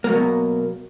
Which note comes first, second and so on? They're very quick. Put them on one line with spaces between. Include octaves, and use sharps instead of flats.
A#3 F#3 B2